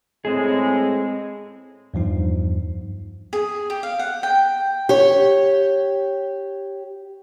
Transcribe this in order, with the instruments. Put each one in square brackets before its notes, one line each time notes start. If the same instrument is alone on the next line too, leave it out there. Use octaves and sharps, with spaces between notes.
[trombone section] A2 G#3 [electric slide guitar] C4 G#4
[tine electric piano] E2 G2 F3 D#4
[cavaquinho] G#4
G4
F5
F#5
G5
[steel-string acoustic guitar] G4 C#5